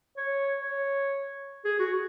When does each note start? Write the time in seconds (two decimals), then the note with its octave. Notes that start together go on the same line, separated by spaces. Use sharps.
0.17 C#5
0.61 C#5
1.65 G#4
1.80 F#4